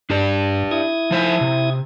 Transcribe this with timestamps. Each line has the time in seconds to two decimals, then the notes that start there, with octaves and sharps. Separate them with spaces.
0.10 G2 D4 G4 D5
0.71 E4 D#6 G#6
1.11 F3 C5 E5
1.41 C3